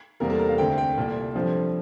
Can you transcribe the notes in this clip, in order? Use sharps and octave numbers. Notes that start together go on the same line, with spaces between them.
E2 C3 G3 A#3 A#4
A4
A#4
F5
D2 D3 A3 C4 G5
G5
C2 A#2 A3
G2 F3 A3 C4